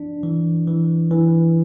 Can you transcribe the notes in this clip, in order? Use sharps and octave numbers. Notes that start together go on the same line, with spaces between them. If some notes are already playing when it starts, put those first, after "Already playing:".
Already playing: F3 D4
E3
E3
E3